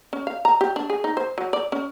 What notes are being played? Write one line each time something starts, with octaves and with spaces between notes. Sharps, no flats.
C#4
F5
A#5
G4
D4
G#4
D#4
C5
F#3
D5
C#4